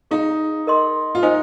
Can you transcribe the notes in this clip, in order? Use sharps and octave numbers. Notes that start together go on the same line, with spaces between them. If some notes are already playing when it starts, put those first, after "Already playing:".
D#4 G#4 F5 A#5
A#4 D#5 C6
F4
D#4 C5 D#5 G#5